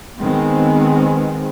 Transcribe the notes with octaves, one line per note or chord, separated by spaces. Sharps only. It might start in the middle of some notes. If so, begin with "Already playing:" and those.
D#3 G#3 B3 C4